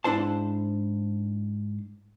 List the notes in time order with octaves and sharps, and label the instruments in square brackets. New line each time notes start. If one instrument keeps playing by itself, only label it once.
[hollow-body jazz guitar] G#2 D4 E4 C5 A5